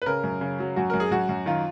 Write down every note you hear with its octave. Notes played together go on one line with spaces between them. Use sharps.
B4
C#3 A#4
F#2
C#3
F#3
F#2 F#4
F#2 A#4
G#4
F#2 F#4
F#2
D#3 F4